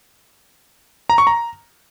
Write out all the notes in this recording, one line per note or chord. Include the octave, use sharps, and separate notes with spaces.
A#5
C#6
A#5